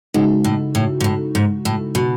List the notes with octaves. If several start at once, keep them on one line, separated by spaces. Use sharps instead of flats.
A2 C#3 G#3 D#4 F#4
A2
A2
G#2
A2
G#2
A2
B2